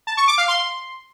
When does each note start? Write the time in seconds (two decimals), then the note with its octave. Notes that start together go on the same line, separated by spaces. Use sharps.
0.07 A5
0.17 C#6
0.28 D6
0.38 F5
0.48 C6